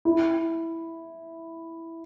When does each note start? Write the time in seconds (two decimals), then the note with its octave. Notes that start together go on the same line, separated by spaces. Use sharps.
0.05 E4